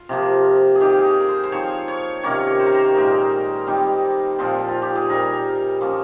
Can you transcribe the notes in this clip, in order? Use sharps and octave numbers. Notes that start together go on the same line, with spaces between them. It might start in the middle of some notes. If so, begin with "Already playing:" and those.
Already playing: F4
C3 F3 A#3
G#4
D#3 A#3 D#4 G4
G#4
A#4
A#4
C5
C5
F3 C4 D#4 C#5
C#5
C3 D#3 A#3 C#4 C#5
C5
A#4
C5
A#2 G#3 D#4 A#4
D#3 G3 C4 D#4
A#2 F3 C4
F4
G4
G#4
A#2 G3 C4 D#4 A#4
F3 A#3 C#4